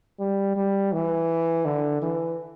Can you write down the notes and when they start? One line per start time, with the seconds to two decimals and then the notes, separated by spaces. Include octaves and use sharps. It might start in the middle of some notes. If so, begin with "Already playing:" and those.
0.20 G3
0.56 G3
0.93 E3
1.65 D3
2.02 E3